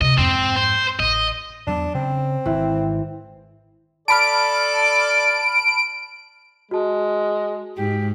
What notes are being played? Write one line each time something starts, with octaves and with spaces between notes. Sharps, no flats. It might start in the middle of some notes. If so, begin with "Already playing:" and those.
C3 D#5
F2 G#2 C4
C5
A1 D#5
E2 F#3 B3 D4
C#3 C4
G#1 E3
A4 D5 A5 B5 F6 D7
G#3 F#4 A5
G#2 G4